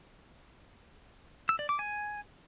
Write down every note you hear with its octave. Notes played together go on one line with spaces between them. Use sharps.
E6
D5
D6
G#5